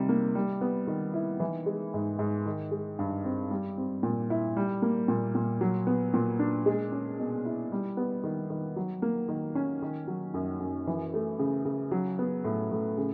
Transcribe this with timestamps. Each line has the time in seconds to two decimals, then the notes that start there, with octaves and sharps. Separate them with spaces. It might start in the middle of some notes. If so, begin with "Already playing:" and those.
Already playing: C3 D#3 G3
0.09 A#3
0.35 G3
0.61 B3
0.87 D#3
1.14 E4
1.40 E3
1.66 G#3
1.94 G#2
2.19 G#2
2.46 D#3
2.71 G#3
2.99 G2
3.25 C4
3.51 G3
3.78 C4
4.03 A#2
4.30 E4
4.57 G3
4.82 A#3
5.08 A#2
5.35 A#2
5.61 F#3
5.87 B3
6.14 A#2
6.39 D4
6.66 G#3
6.92 C#4
7.19 B2
7.45 E4
7.72 G3
7.97 B3
8.24 D#3
8.50 D#3
8.76 F#3
9.02 A#3
9.29 D#3
9.55 C#4
9.82 D#3
10.07 F#3
10.34 F#2
10.60 F#2
10.87 E3
11.14 A3
11.39 C#3
11.65 C#3
11.91 F#3
12.19 B3
12.44 A2
12.71 A2
12.98 C#3